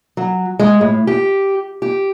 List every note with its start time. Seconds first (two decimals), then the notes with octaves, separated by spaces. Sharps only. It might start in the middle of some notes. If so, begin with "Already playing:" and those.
0.17 F#3
0.59 G#3
0.81 A2
1.07 G4
1.82 G4